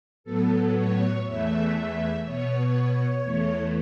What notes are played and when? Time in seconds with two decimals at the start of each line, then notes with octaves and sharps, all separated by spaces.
0.24 A2 F#3 B3 A4
0.74 C#5
1.24 E2 E3 A3 E5
1.74 E5
2.24 B2 B3 C#5
3.24 E2 E3 A3